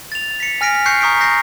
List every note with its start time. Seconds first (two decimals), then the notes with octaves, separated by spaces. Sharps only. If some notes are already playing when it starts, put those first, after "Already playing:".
0.12 A6 F7
0.40 B6 C#7
0.61 G#5 F6 A#6 B6 D7
0.86 C#6 F#6 G6 C7 C#7
1.01 A#5 C#6 D#6 G6 B6 D7
1.20 G6 A#6 C7